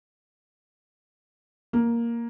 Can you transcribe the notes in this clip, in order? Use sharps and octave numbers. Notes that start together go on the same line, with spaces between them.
A#3